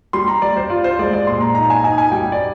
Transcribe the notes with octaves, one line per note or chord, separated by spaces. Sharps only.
G3 C6
A#5
G3 D5
C5
F4 D5
C5
G#3 D5
D5
A#2 C6
A#5
D#4 A#5
G#5
D#4 G#5
G#5
G3 G5
D5